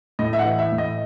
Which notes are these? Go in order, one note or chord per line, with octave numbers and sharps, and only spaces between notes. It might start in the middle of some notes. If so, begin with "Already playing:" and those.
A2 D#5
E5
F#5
E3
E5
A2
D#5